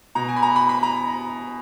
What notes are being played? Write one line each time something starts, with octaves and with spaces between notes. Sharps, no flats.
B2 A#5
G#5
B5
A#5
B5
B5
A#5